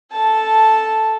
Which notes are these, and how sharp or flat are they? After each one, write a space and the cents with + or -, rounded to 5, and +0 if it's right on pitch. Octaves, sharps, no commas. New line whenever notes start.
A4 +0 A5 -5